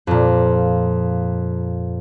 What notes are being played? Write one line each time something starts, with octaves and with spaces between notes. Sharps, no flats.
F2 A#2